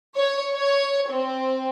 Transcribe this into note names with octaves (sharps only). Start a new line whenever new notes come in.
C#5
C#5
C4